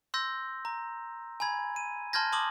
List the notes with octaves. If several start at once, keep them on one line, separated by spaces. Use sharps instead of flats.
C6 E6 G6 A#6
A#5
G#5 A#5 B5 G#6
D#7
A5 C6 F6 G6 G#6 A#6
A5 C6 D6 D#6 F#7